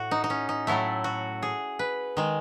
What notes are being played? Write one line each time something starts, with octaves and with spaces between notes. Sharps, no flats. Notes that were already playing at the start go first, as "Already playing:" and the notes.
Already playing: A2 F#4
D#4
D#4
C#4
D#4
A2 F#3 A3 E4
F#4
G#4
B4
D#3 G#3